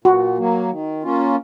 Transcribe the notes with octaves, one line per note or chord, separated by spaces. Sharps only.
A#2 F#4
F#3 A#3
D#3
A#3 C#4 F4